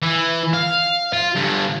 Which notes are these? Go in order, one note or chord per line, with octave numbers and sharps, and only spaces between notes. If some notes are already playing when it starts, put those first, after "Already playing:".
E3
F5
F4
G2 D3